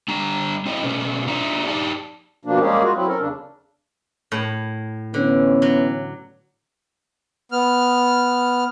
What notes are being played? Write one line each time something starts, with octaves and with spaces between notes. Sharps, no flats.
D3 G3 A#5
C4 E4 D#5
B2 A3 C#4
D4 F4 D5 E5 A#5
D#4 G4 D5 A5
B2 F3 A#3 D4
G3 G#3 A#3 C#4 G4 G#4
F4 F#4
F#3 C4 E4
C#4 A4 A#4
E2 C#3 D4
A2
D3 E3 B3 C#4
F#3
B3 F6